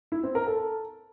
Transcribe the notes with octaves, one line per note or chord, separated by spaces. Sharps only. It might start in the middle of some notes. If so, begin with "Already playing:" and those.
E4
C4
A#4
A4